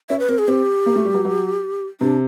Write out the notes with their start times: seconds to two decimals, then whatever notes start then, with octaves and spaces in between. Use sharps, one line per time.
0.09 C#4 E5
0.19 B4
0.29 C4 A#4
0.38 G#4
0.48 C4 G4
0.86 A#3
0.96 A3
1.05 G3
1.14 F#3
1.25 F#3
2.00 C3 D4